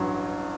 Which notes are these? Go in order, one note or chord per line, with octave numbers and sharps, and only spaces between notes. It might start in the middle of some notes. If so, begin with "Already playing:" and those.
Already playing: A1 G2 F#3